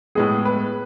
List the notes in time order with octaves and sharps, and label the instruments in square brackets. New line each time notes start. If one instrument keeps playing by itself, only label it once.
[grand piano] A2 G#3 B3 [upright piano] G#4
[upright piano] B4